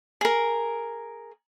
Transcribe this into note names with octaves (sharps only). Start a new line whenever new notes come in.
G#4 A#4